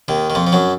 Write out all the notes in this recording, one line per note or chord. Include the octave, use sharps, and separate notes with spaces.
D#2 D#3
D#3
F2 F3
F3
F#2 F#3